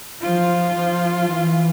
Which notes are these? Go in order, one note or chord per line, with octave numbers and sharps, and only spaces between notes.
F3 F4
F3
E3